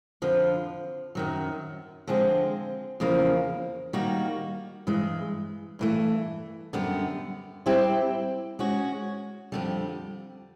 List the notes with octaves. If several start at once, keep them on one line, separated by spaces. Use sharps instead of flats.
F2 D3 F3
F#2 D#3 F#3
D3 F3 G#3 C4
E2 C#3 F3 A#3
D#3 G3 A#3 D#4 F#4
G2 E3 G#3
G2 E3 A3
F#2 D3 G3 B3
G3 C4 E4 G4 C5
G#3 C#4 F#4
F2 D3 G3